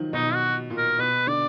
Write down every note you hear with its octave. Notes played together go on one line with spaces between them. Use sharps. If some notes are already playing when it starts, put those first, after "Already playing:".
Already playing: D#3 F3 F#3
B2 D#4
F#4
A#2
A#4
B2 B4
D3 D5